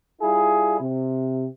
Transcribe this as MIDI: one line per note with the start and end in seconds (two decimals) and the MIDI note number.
0.21 0.77 55
0.21 0.77 64
0.21 0.77 65
0.21 0.77 68
0.80 1.46 48